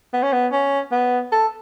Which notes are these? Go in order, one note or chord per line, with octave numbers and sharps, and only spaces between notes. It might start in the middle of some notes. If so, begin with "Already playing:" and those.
B3
C#4
B3
C#4
B3
A4